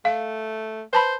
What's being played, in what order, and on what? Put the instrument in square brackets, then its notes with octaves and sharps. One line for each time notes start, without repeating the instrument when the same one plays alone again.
[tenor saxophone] A3 [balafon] F5
[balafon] B4 A5 B5 [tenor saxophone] C5